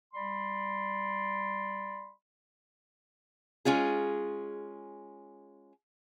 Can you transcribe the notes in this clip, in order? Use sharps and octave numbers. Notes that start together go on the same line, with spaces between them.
G3 D5 B5 C6
G#3 C#4 F4 G#4